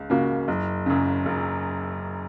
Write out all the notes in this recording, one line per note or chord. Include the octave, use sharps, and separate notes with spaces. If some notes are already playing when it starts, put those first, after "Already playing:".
Already playing: C#2
C#3 A#3 F#4
F#1
F#2 C#3
F#1